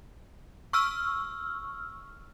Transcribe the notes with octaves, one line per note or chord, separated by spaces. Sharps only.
C#6 E6 F6